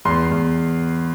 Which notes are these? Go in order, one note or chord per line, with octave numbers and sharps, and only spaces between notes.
E2 C6
E2